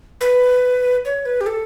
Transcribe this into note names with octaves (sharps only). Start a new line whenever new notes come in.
B4
C#5
B4
G4
A4